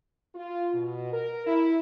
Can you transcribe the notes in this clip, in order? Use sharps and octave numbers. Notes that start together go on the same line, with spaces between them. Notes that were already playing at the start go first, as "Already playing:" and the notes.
F4
B2
A#4
E4